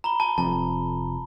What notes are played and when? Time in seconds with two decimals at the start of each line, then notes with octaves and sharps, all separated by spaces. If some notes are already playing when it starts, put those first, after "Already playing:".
0.04 A#5 B5 G7
0.20 A5
0.38 F1 F2 A5